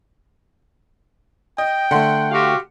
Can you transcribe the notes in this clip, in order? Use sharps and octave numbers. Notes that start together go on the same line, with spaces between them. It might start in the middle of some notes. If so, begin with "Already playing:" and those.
D#5 G5
D3 A3 F#5 C6
F#4 G4 F5